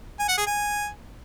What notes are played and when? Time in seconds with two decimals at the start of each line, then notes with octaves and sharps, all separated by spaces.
0.19 G#5
0.28 F#5
0.37 G#4
0.46 G#5